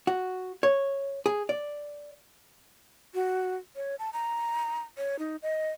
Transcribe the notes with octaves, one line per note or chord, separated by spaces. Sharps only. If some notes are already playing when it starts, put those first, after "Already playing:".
F#4
C#5
G#4
D5
F#4
C#5
A5
A#5
C#5
D#4
D#5